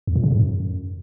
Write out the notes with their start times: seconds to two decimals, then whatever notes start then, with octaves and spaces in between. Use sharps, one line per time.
0.07 E2
0.15 A#2
0.24 C#3
0.32 G#2
0.40 F#2